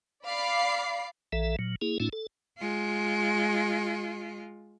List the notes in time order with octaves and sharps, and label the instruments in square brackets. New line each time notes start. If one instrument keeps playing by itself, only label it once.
[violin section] D5 F5 B5 D6 C7
[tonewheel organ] A#1 E3 A4 E5
A#2 F#3
A#3 E4 G#4
A2 A3 C#4 D#4 F4
A4
[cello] G#3 F4